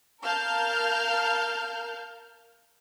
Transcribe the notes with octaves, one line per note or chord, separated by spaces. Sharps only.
A#4 F5 A5 F6 G6